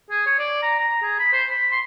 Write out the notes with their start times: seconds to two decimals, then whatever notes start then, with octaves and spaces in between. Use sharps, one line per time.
0.10 G#4
0.26 C#5
0.39 D5
0.62 A#5
0.80 A#5
1.02 G#4
1.20 B5
1.33 C5
1.51 B5
1.71 C6